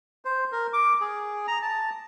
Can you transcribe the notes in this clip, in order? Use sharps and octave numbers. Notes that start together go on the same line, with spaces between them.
C5
A#4
D6
G#4
A#5
A5